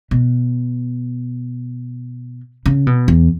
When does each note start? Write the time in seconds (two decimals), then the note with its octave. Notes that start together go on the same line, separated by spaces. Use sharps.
0.11 B2
2.66 C#3
2.87 B2
3.08 E2